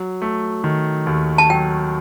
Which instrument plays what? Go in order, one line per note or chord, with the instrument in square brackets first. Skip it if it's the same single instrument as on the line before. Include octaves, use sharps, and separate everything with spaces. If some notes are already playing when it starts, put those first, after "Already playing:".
Already playing: [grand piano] F#3
A3
D#3
D#2
[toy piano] A5
[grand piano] F#3 [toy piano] G5